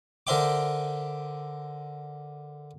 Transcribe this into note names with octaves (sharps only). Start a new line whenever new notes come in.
D3 A#4 C5 E5 G5 D6